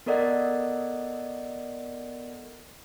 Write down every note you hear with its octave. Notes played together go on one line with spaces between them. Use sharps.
B3 A4 A#4 D5 D#5 F#5